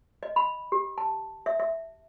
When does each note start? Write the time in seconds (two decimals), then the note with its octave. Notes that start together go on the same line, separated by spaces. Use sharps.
0.23 D#5
0.36 B5
0.72 G4
0.98 A5
1.46 E5
1.60 E5